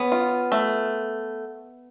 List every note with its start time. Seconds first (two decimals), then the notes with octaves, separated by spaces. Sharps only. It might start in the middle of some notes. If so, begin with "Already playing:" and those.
Already playing: B3 C#4
0.12 F4
0.52 A3